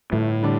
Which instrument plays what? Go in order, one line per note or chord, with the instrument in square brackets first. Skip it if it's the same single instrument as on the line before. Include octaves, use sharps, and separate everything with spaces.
[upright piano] G1 [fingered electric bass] A2
[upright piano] D3 G3 D4